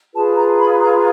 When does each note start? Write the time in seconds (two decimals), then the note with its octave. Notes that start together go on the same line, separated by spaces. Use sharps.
0.13 F4 G#4 B4 A5
0.36 A#5
0.58 B5
0.80 A#5